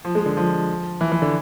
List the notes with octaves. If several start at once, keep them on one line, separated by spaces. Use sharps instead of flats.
F3
G#3
D3
F3
E3
E3
D3